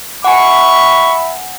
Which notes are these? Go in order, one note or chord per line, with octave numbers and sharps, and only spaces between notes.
E5 F#5 G#5 B5 C#6